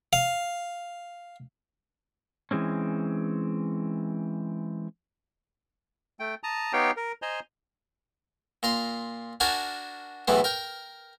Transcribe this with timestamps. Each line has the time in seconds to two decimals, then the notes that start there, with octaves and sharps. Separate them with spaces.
0.13 F5
2.51 E3 G#3 C4 C#4
6.20 A3 G5
6.43 A5 A#5 D#6
6.73 B3 D#4 G4 C#5 F5 G5
6.97 A#4
7.22 C5 D#5 G#5 A#5 C6
8.63 A#2 A#5 C6
9.40 D4 F#4 A#4 G#5 A5
10.28 B1 E2 A2 E3 B3
10.44 A#4 G5